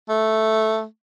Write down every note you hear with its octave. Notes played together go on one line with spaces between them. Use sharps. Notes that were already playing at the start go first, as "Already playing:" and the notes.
A3